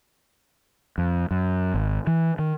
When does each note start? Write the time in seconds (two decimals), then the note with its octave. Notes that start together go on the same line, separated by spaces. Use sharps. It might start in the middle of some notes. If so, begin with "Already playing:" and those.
0.98 F2
1.31 F#2
1.74 G#1
2.07 E3
2.39 D#3